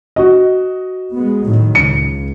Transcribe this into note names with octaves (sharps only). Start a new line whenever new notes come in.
F#4 D#5
G#3 B3
A2 D#3 F#3
C#2 C#7